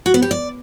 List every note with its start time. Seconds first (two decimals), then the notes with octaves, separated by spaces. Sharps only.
0.06 F#4
0.14 B3
0.22 G4
0.31 D5